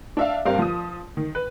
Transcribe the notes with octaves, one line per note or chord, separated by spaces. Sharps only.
D4 E5 F5
G2 G3 C4 A#4 F5
F3 D#6
D#3
B4